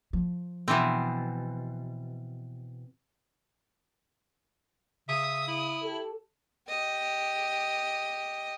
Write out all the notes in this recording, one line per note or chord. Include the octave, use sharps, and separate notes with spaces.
F3
B2 E3 C4
C#3 E5 D#6
E4
G4 A4
G4 D#5